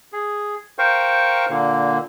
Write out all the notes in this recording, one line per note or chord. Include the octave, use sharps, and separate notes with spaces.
G#4
A#4 C5 F5 G5 C#6
A#2 D3 A#3